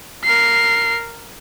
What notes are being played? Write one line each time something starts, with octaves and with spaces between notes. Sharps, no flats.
A#4 C7